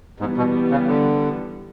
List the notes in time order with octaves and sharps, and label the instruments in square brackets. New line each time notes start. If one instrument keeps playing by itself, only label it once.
[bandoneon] G#2 [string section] E3 G3 B3
[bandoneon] B2
C#3
D3